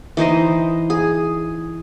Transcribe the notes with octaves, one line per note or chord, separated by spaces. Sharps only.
E3 D#4 C5 D#5
G#4